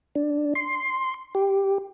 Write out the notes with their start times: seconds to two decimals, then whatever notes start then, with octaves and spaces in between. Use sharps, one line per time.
0.15 D4
0.55 C6
1.35 G4